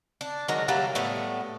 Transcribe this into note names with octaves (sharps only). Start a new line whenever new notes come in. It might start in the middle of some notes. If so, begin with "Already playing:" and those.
D4
D#3 F#3 G#3 A#4
F#3 G3 A3 A#3
A2 G3 A3 B3